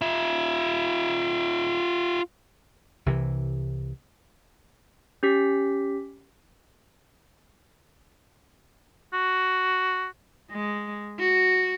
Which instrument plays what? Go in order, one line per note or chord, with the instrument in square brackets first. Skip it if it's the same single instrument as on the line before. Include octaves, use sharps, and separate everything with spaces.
[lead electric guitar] F4 E5
[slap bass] C2 C3 E3
[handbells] C#4 G4 B6
[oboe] F#4
[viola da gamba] G#3
F#4